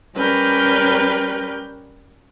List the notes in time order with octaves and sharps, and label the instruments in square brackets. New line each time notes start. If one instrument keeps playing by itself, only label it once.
[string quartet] G3 C#4 A#4 B4 G6